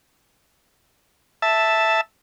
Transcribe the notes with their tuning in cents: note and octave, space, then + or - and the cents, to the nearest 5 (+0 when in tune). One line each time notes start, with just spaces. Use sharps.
E5 +0 A5 +0